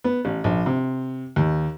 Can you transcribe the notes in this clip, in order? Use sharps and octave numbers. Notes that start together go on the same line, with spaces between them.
B3
A1
A#1
C3
D#2